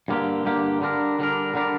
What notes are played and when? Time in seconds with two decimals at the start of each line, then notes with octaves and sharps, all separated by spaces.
0.08 G2 D3 A#3 G4
0.44 G2 D3 A#3 G4
0.81 D3 G3 D4 A#4
1.19 D3 G3 D4 A#4
1.55 D3 G3 D4 A#4